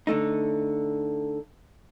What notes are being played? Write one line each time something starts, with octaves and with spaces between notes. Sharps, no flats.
D3 A3 D#4